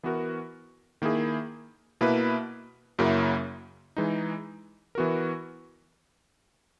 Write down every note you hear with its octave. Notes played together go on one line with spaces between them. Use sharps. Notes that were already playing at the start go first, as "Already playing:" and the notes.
E3 B3 F#4 A#4
D#3 A#3 E4 G#4
B2 A#3 E4 B4
F#2 C#3 F#3 A#3 E4
E3 G#3 D#4
E3 B3 F#4 A#4